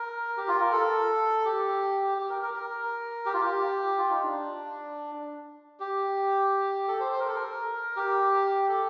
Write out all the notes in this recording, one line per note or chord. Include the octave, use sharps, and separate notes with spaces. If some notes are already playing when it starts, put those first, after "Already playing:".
Already playing: A#4
G4
F4
A#4
A4
G4
G4
A#4
A#4
A#4
G4
F4
G4
F4
D#4
D4
G4
A4
C5
C5
A#4
A4
A#4
G4
A4